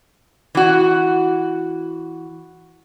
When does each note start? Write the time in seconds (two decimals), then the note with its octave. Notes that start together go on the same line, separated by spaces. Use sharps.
0.55 E3 F#4